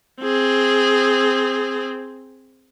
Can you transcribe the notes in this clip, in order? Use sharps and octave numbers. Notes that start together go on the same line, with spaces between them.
C4 G#4